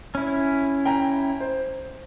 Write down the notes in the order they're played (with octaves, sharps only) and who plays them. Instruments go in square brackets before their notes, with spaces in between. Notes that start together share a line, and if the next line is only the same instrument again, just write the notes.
[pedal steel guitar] C#4 E4
[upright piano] G5 A#5
C5